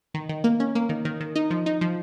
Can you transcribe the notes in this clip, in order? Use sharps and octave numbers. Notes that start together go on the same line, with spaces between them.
D#3
D#3
A#3
C#4
A#3
D#3
D#3
D#3
D#4
F3
D#4
F3